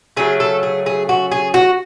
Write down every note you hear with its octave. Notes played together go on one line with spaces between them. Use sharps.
C#3 F#3 A3 G#4
A4
G#4
G#4
F#4
G#4
F#4